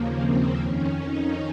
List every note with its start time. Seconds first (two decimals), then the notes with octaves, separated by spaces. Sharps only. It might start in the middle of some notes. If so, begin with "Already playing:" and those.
Already playing: D#2 C#3 F3 A#3
0.18 C4
0.59 F2 D#3 C#4
1.03 D#4